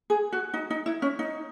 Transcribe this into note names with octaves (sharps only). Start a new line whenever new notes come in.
G#4
F#4
D#4
D#4
E4
C#4
D#4